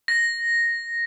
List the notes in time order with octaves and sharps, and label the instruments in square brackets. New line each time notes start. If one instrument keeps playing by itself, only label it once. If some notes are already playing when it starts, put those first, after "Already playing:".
[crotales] A#6